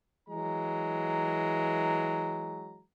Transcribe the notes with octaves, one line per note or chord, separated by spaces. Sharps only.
E3 F#3 G#3 A#5